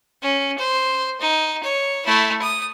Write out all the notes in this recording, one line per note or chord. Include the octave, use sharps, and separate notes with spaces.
C#4
C5
D#4
C#5
A3 E4
D#6